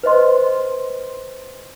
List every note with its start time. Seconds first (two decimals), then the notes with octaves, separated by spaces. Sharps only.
0.03 B4 C5 D#5 C6